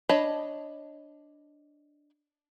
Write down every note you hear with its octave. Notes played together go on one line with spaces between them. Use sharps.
D4 C#5 D#5 A5 B5